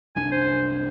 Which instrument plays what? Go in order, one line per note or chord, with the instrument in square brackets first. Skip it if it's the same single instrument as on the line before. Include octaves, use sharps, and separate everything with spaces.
[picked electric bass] F#1 C2 D4 [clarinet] G#5
[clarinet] C5